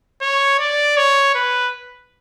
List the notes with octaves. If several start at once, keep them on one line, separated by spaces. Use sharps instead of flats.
C#5
D5
C#5
B4